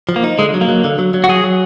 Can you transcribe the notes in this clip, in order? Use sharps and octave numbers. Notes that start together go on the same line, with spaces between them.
F3
A#3
D#4
D3 G#3
F#3
A#3
F#3
D3
F#3
F#3
F#4
F#3 G#4
F#3